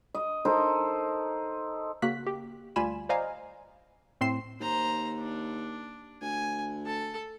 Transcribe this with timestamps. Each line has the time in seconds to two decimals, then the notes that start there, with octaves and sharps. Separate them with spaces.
0.14 D#5
0.45 D#4 A4 A#4 C5
2.02 C#3 A#3 F#4 F#6 B6
2.27 G4
2.76 D2 G3 F4 G#5 B5 E7
3.09 C5 D5 D#5 F5 G#5 A#5
4.21 A2 C4 C6 C7 E7
4.61 D#2 C5 A#5
5.19 D4
6.22 D2 G#5
6.86 A4 A5